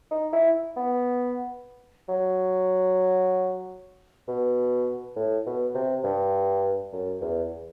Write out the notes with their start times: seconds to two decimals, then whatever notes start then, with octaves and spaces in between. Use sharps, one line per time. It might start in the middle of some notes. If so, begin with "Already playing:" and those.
0.11 D#4
0.33 E4
0.77 B3
2.08 F#3
4.28 B2
5.16 A2
5.46 B2
5.74 C3
6.04 G2
6.93 F#2
7.21 E2